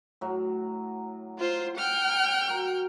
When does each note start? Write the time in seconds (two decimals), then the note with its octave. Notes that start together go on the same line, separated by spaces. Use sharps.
0.21 A2 F#3
1.38 F4 C5
1.78 F#5 G5 F6
2.48 F#4 A#4